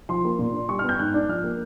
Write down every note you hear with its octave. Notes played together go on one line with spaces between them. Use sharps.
F3 C6
A#3
A#2
D4
G3 C#6
B3 F6
G6
G#2 F#6
D4
F3 F6
A#3